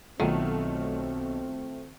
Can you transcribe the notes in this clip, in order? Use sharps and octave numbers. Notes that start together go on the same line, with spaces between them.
B1 D#3 A3 C4 F4 F#4